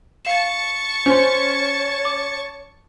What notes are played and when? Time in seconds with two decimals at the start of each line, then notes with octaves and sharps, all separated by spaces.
0.25 F5 A5 C#6 E7
1.06 C#4 C5 C#5 C6
2.05 D6